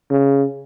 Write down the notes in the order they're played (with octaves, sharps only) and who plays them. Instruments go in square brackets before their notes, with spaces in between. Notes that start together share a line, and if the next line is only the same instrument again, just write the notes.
[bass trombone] C#3